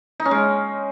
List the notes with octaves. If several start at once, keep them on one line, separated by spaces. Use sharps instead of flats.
D#4
C#4
G#3